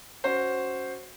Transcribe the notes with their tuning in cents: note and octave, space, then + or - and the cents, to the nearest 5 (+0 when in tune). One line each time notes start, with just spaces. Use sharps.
C#4 +0 F#4 +0 C5 +0